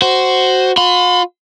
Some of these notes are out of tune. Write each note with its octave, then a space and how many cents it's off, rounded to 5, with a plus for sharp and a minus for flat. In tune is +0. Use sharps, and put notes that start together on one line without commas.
F#4 +10 C5 +0
F4 +45 B5 +45